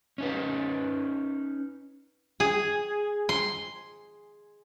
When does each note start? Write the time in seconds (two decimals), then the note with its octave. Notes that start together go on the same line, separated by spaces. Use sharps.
0.18 C#4 D#4 B4
2.40 G#4
3.29 C6